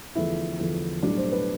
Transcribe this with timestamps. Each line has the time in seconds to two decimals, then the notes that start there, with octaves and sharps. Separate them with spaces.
0.15 E2 D3 F3 A3 E4
0.59 E2 D3 F3 A3
1.03 B1 A2 G3 D4
1.17 C5
1.32 B4